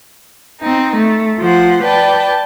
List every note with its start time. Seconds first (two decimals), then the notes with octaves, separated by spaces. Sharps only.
0.60 C4 D#4
0.97 A3
1.39 F3 C5 F#5
1.83 B4 D5 G5 A5